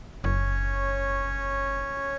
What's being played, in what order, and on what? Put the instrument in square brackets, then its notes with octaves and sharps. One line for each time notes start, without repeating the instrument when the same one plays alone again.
[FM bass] F#1 [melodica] C#4 C#5